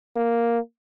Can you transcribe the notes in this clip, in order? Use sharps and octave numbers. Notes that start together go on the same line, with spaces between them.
A#3